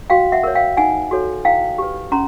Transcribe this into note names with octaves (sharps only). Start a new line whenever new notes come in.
F#4 F5 G5
E5 F#5
A#4 C#5
F5 G5
D#4 F#5 G#5
F#4 A4 C#5
E4 F5 G5
G4 B4
C#4 A#5 C6